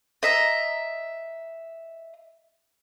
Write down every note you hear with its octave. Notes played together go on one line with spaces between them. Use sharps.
D#5 E5 A#5